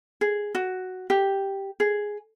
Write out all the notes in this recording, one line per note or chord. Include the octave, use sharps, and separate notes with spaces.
G#4
F#4
G4
G#4